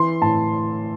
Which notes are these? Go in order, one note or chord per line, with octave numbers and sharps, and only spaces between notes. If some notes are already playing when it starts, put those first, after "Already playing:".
Already playing: E3 C6
A2 A5